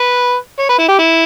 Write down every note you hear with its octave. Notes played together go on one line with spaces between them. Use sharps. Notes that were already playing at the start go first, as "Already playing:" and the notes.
Already playing: B4
C#5
B4
E4
G4
E4